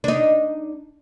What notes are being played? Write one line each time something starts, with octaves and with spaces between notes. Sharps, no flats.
D4 D#4